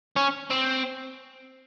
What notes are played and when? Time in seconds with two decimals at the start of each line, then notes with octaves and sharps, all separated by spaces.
0.16 C#4
0.50 C4